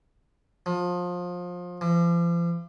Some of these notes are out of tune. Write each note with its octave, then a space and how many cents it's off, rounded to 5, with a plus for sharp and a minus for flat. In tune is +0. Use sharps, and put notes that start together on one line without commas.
F3 +25
F3 -40